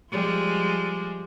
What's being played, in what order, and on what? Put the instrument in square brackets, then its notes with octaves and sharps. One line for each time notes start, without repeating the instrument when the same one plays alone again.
[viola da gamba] F3 G3 G#3